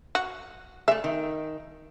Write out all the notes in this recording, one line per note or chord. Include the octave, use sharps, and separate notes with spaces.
F#4
G#3 A3 E5
D#3